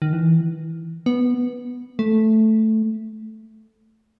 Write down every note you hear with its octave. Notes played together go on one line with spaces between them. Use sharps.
D#3
E3
B3
A3